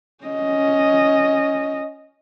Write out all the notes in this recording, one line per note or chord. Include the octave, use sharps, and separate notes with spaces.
C#4 D#5